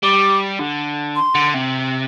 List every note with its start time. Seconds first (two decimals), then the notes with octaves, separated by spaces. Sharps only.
0.03 G3 D6
0.60 D3
1.16 C6
1.35 D3
1.54 C3